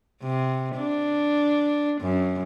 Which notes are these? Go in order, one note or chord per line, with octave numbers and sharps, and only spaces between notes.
C3
D4
F#2